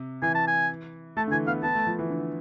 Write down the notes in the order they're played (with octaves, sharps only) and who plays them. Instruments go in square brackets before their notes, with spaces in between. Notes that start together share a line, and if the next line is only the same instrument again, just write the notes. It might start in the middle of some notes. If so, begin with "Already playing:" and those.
Already playing: [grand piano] C3
[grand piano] E3 [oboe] G#5
[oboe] A5
G#5
[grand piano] A3 [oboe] A5
[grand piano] D3
[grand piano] E3 [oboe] G#5
[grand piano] B3 [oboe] F5
[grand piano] B3 [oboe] A5
[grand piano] A3
F3
E3
D3